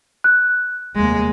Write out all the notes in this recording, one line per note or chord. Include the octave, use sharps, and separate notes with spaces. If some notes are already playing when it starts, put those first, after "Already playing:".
F#6
F1 D#2 G#3 A#3